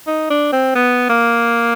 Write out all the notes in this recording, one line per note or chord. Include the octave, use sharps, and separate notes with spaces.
D#4
D4
C4
B3
A#3